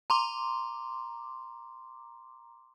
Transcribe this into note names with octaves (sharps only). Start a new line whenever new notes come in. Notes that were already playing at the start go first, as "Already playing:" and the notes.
A#5 C6 D6